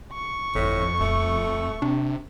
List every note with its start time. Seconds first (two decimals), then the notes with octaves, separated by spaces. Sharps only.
0.13 C#6
0.55 G1 F2 A2
1.00 D#1 A3
1.82 C3 D4